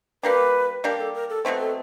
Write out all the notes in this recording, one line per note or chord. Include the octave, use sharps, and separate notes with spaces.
G3 A#3 D4 G4 B4
G3 A#3 D4 G4 A#4
A4
A#4
A4
B2 F#3 A3 C4
A4